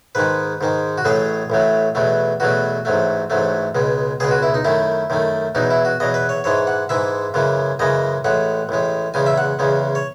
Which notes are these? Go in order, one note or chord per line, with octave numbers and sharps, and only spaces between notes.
G#2 D#3 G#3 B4
G#2 D#3 G#3
F#4
A1 A2 F#3 A3 G#4
A1 A2 F#3 A3
E2 B2 F#3 A3
E2 B2 F#3 A3 F#4
A1 G#2 F#3 A3
A1 G#2 F#3 A3
C#2 B2 G#3
C#2 B2 G#3 G#4
F#4
E4
D#4
F#2 D#3 A3 E4
F#2 D#3 A3
E2 B2 F#3 D#4
E4
F#4
E2 B2 F#3 D#5
B4
C#5
G#2 E3 G#3 C#5
F#5
G#2 E3 G#3 E5
F#2 C#3 E3 G#3
F#2 C#3 E3 G#3 D#5
A1 A2 G#3 F#5
A1 A2 G#3
E2 C#3 G#3 G#5
E5
F#5
E2 C#3 G#3
C#5